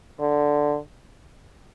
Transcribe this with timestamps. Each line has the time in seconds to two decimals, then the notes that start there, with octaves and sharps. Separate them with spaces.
0.20 D3